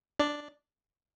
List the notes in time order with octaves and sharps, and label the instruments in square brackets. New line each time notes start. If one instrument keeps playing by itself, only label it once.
[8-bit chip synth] D4 D5